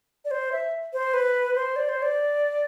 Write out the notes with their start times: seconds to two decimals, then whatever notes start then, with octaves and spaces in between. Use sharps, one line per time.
0.25 D5
0.31 C5
0.52 E5
0.93 C5
1.14 B4
1.55 C5
1.76 D5
1.89 C5
2.02 D5